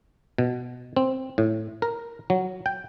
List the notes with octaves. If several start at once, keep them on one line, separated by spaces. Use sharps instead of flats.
B2
C4
A2
A#4
F#3
G5